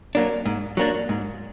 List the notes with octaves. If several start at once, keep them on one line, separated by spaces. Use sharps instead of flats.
F#3 A#3 D4
G#2
F#3 A#3 D4
G#2